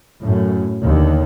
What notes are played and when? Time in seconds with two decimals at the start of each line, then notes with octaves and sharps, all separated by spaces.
0.20 F#2 A2
0.84 D#2 D3